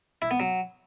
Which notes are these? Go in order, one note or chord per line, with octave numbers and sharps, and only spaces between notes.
E4
B3
F#3